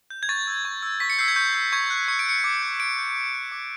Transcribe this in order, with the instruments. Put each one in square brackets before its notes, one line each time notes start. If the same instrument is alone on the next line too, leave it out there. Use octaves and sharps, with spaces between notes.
[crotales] G6
G#6
C#6 A6
E6 G6
C#6
E6 G6
C#6 B6
C#7
E6 G6 C7
G#6
C#6 G6
E6 G6
C#6 G#6
F#6
C#6 C#7
D7
F#6 C#7
D6
G6
D6 D7
G6
D6
F#6
D6